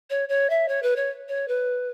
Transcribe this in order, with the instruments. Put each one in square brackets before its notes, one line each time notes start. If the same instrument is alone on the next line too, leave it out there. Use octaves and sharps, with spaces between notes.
[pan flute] C#5
C#5
E5
C#5
B4
C#5
C#5
B4